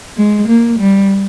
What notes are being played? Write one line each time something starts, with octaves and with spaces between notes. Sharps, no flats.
G#3
A#3
G3